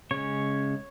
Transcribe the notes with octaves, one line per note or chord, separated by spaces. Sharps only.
C#3 G#3 C#4 C#5